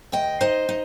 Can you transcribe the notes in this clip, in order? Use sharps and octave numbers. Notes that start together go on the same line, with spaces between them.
D2 D#5 G5
D#4 C5 D#5
D#4